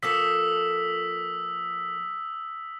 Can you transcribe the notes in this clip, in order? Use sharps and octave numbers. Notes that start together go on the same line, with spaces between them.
F3 A#3 A4 D#6 E6 B6